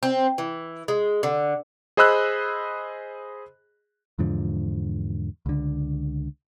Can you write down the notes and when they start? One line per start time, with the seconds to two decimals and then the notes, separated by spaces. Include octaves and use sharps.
0.03 C4
0.38 E3
0.88 G#3
1.23 D3
1.97 G#4 C5 D#5 B5 E6 F#6
4.19 E2 G#2 D3 F3
5.46 C#2 D3